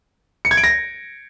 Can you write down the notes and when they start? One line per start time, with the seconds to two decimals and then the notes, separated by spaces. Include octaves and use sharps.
0.45 C#7
0.51 G#6
0.57 D7
0.64 A#6